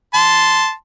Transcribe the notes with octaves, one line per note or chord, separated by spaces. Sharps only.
A5 C6